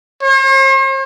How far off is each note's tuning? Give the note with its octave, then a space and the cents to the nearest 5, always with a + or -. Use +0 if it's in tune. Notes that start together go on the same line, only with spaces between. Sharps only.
C5 +45